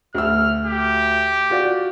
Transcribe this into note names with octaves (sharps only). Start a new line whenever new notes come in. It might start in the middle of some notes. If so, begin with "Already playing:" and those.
D2 E6 F6
G4
F4 F#4 D5